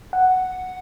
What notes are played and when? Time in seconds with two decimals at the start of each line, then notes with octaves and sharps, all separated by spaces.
0.13 F#5